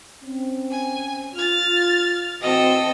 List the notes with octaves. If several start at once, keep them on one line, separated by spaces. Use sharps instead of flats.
C4 C#4
G#5
F4 F6 A6
A2 E3 C4 F#4 A4 D#5 E6